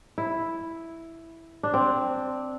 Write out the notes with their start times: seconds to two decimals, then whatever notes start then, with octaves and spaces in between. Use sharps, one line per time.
0.18 E4
1.63 D4
1.74 C4